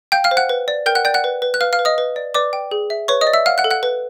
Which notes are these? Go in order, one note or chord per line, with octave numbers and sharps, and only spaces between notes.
F5 G5 G6
F5 F6
C5
F#5 F#6
B4
D5
A#4 G5 G6
F#5 F#6
D5 G5 G6
F#5 F#6
B4
B4
F#6
B4 F5 F6
F5 F6
B4
D#5 D#6
B4
D5
B4 D5 D6
G5
G#4
E5
B4 C#5 C#6
D#5 D#6
D5
E5 E6
F5 F#5 F6
F#5 F#6
A4
F#5 F#6
B4